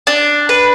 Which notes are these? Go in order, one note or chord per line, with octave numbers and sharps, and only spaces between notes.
D4
B4